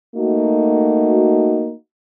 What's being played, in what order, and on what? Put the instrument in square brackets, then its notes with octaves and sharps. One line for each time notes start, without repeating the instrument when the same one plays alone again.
[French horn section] A3 A#3 D#4 F#4